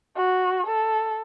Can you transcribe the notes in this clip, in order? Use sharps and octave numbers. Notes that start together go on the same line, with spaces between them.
F#4
A4